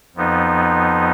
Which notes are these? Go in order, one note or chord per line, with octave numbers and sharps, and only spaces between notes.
F2 F3 B3 D#4